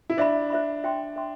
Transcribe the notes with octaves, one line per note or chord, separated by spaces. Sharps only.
E4
D4 C5 E5 B5
C5 E5 B5
C5 E5 G5 C6
C5 E5 G5 C6